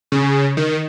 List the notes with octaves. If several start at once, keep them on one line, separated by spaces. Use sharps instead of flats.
C#3
D#3